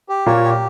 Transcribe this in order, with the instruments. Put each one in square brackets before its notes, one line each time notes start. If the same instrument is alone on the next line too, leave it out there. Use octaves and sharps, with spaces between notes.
[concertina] G4
[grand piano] A#2 A#3 [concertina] C#5
[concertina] G4